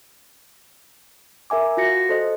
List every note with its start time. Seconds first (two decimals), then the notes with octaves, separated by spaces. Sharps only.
1.50 A#4 E5 G#5 D6
1.77 F4 F#4 A#6 C#7
2.09 A4 C5 D#5